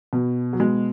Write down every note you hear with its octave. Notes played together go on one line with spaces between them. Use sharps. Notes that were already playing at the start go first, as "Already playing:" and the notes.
B2
F#3
B2 G#3